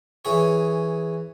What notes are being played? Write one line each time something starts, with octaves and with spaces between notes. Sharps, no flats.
E3 G#4 C#5